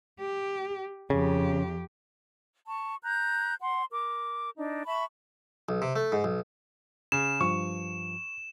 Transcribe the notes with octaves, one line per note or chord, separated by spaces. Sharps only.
G4
F2 C#3 G4
A5 C#6
A#5 F#6 G6
F#5 C6
A#4 D6
D4 D#4
E5 A5 B5 C#6
B1
C3
A3
G#2
B1
C#3 E7
G2 F3 C#6